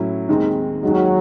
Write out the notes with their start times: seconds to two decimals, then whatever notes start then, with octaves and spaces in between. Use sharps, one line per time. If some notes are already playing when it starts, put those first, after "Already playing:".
Already playing: A2 F#3 C#4 E4
0.29 D#2 D#3 G#3 C4
0.83 D#2 D#3 F#3 G#3